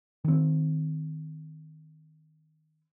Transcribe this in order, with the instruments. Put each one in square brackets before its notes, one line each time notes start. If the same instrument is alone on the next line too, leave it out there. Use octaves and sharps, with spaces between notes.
[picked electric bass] D#3 C4